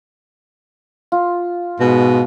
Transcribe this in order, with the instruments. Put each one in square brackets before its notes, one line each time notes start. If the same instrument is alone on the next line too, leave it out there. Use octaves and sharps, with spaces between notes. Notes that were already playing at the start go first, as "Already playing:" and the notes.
[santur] F4
[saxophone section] G#2 B2